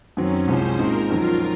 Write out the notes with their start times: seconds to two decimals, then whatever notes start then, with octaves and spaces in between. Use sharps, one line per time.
0.17 F#2 D#3 F#3 C4 C#4
0.47 C2 C3 F3 G#3 C5
0.78 A#2 G#3 C4 D#4 A#4
1.10 F2 D#3 F#3 C#4 F4